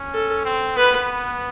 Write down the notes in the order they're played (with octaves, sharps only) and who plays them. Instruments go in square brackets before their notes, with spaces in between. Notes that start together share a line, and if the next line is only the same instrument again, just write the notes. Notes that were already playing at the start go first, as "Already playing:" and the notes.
Already playing: [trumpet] C#4
[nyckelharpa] A4
[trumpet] C4
[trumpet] B3 [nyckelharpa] B4